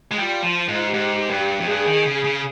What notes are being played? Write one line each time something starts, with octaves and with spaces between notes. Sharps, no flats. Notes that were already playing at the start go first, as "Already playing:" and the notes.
G#3
G3 F4
F3
G#2
G#2 G4
G2
F2
G2 G#4
D#3
C#3
C#3